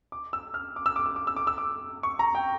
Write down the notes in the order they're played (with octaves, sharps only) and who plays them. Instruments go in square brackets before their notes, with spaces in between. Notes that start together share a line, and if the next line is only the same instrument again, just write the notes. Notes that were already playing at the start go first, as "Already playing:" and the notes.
[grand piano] D6
E6
F6
D6
E6
D6
E6
D6
E6
D6
E6
D6
C#6
A#5
G5